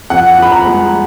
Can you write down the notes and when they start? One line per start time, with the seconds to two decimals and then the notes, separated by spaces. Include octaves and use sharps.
0.10 F2 F#5
0.38 F3 B5
0.52 A#5
0.67 G#3